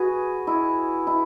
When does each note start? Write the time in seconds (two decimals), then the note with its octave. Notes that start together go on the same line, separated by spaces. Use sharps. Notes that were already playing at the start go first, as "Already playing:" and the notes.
Already playing: F#4 G#4 B4
0.47 E4
1.07 E4